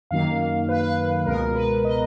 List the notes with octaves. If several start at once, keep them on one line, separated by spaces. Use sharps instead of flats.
F#2 D#3 F#3 A#3 F5
B4
B4
C#2 B2 G#3 B3 A#4
B4
D#5